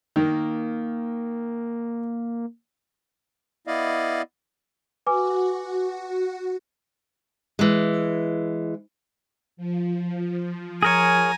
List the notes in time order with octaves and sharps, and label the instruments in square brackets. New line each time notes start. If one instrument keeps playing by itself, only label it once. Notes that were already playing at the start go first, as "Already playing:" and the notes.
[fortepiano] D#3 [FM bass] A#3
[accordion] B3 E4 D5 D#5 F5
[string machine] F#4 [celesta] B4 G#5 D6
[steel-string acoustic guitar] E3 G#3
[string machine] F3
[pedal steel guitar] G#4 A#4 C#5 [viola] G#5 A#5